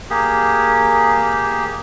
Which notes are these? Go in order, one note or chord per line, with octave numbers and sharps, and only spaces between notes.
A#3 G4 G#4